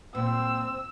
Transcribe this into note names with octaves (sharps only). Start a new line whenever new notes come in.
A#2 C4 E6